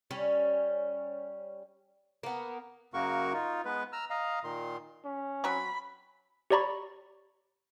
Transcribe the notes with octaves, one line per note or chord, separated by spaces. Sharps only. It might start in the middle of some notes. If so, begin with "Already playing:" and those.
G3 C#4
A#3 B3
F#2 C#3 A#3 F#4 A#4 C#6
D#4 F4
G#3 B3 B4
A#5 E6 F6
D#5 F5 A#5
A#2 D#3 C6
C#4
F#3 C4 B5 C#6
G4 C#5 D5 A#5 B5 C#6